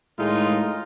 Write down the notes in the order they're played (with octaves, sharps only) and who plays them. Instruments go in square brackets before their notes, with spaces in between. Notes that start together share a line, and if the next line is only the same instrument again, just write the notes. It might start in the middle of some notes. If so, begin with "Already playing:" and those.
[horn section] A2 D#3 G#3 D#4 F4